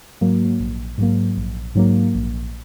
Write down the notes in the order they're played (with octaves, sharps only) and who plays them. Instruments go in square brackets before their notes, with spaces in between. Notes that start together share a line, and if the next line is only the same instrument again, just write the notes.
[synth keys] G#2 F#3 A#3
A#1
G#2 F#3 A#3
A#1
G#2 F#3 A#3
A#1